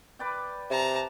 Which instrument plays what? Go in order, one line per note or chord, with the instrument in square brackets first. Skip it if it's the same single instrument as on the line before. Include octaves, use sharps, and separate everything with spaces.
[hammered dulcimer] B4 D5 G5
[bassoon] C3 [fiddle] A5 A#5